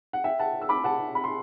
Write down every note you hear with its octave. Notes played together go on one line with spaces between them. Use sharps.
F#5
E5 G5
F#5 A5
E6
B5 D6
F#5 A5
B5
C6